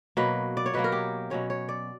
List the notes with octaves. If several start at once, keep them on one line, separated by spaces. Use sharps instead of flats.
B2 F#3 A#3 B4
D5
C#5
B2 F#3 A#3 B4
A#4
G4
B2 F#3 C#4 C#5
C#5
D5